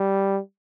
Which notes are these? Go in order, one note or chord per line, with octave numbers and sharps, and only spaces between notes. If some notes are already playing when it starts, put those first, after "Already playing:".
Already playing: G3